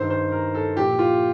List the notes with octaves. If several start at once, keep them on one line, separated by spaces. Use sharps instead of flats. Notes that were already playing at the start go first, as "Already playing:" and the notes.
Already playing: G2 D#3 C5
C5
A#4
A4
A#2 F3 G4
F4